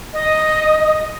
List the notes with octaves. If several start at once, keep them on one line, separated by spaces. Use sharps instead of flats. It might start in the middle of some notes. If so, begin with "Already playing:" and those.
D#5